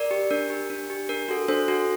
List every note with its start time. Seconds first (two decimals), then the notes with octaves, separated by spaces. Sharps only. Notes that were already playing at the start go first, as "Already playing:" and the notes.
Already playing: A#4 D5
0.11 G4
0.31 D4 A#4
0.50 G4
0.70 D4
0.90 G4
1.09 D4 A#4
1.28 F#4 A4
1.48 D4 A4 C5
1.68 F#4 A4